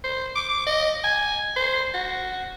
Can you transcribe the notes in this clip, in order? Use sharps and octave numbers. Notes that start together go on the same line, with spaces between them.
C5
D6
D6
D#5
G#5
C5
F#4